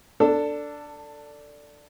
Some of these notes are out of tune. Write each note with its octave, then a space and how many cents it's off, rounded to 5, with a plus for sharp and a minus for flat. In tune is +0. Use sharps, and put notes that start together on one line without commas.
D4 -5 A4 +20